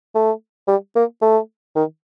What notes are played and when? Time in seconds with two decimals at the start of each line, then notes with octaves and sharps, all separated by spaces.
0.15 A3
0.67 G3
0.96 A#3
1.22 A3
1.76 D#3